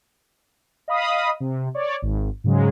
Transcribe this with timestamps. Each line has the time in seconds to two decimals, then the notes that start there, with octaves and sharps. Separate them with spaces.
0.88 D#5 F5 B5 D#6
1.40 C3
1.75 C#5 D5
2.02 G#1
2.44 G#2 C#3 F#3 G#3